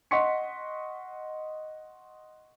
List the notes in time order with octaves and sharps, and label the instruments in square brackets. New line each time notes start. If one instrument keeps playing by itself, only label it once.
[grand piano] D#5 F#5 C6 C#6 B6 C#7